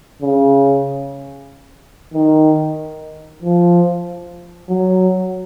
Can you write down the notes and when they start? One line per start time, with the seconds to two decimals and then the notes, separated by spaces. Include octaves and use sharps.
0.22 C#3
2.14 D#3
3.42 F3
4.69 F#3